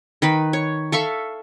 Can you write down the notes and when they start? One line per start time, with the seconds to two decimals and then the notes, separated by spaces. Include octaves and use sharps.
0.22 D#3 B4 B5
0.53 C#5
0.92 A4 E5 F5 C#6